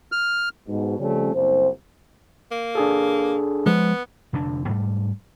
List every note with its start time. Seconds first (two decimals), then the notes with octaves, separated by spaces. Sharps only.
0.12 F6
0.68 G#2 B2
0.99 C#3 F3 G3 A3 C4 C#4
1.34 F#1 C2 C5
2.51 A#3
2.75 D4 G#4 A4
3.66 F3 G#3 B3
4.33 F1 F2 D3 D4
4.68 G#2 G3 A3